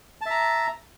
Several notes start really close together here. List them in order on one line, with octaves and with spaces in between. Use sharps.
A5 E5 A#5